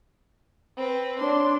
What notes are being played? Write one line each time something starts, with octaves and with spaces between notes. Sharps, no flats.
C4 B4
D4 C#5 C6